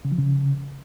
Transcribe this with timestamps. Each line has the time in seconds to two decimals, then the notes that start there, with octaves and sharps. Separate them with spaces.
0.05 C#3
0.12 F3
0.18 C#3